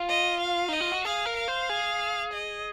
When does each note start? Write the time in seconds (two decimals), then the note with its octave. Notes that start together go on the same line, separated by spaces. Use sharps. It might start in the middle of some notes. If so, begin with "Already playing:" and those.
Already playing: F4
0.08 D#5
0.41 F5
0.69 D#4 D#5
0.81 F4
0.92 F#4
1.05 G#4 F5
1.25 A#4
1.36 F5
1.48 C5
1.69 G#4
2.33 D#5